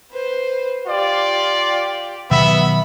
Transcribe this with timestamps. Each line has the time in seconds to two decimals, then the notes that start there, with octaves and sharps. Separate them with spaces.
0.11 B4 C5
0.87 F4 G4 D5
2.31 B2 D#3 F#3 B3 E5 B5